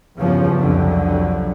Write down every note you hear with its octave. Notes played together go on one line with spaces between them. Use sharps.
E2 G2 C#3 F3 C#4
C2 F2 D3 F#3